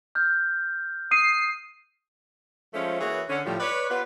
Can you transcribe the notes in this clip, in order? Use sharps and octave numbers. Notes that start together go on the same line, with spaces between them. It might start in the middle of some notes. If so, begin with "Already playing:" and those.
F6 G6
D#6 C7 D#7
F3 G#3 A3 C#4 F4 C5
E3 A#3 F#4 G#4 B4 C#5
D3 C#4
A2 F3 G3
B4 C#5 D5
B3 F4 G4 B4